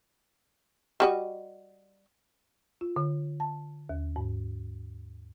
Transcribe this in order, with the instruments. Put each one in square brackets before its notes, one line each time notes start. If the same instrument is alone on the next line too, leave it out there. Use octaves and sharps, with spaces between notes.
[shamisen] G3 F#4 D#5
[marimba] F4
D3
A5
D#2
G#2